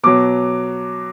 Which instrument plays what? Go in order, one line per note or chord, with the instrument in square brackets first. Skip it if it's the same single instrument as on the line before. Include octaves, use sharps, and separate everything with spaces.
[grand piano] B2 F#3 D6